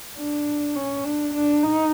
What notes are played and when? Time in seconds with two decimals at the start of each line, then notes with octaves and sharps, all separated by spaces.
0.18 D4
0.75 C#4
1.05 D4
1.34 D4
1.63 D#4